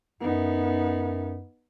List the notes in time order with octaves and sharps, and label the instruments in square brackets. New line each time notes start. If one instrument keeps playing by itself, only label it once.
[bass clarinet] F#2 [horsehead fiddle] B3 D#4